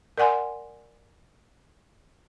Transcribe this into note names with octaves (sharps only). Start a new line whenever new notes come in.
A#4 D5 F#5 G#5 C6